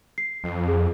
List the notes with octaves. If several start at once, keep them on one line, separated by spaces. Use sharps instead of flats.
C7
F2
G#4